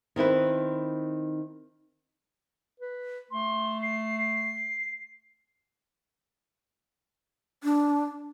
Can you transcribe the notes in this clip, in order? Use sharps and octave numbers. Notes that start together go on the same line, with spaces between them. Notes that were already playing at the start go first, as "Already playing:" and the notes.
D#3 C4 E4 B4
B4
A3 C6
C7
D4